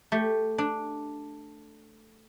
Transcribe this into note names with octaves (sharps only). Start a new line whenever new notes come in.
A3 G4
D4